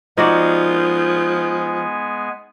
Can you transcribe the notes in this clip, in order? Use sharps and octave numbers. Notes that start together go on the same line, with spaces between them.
F3 G#3 B3 D#4 F#4 D5 G#5